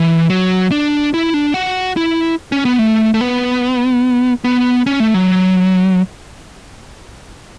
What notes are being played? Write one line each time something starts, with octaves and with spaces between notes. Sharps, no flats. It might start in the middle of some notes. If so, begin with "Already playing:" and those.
Already playing: E3
F#3
D4
E4
D4
F#4
E4
C#4
B3
A3
A3
B3
B3
C#4
A3
F#3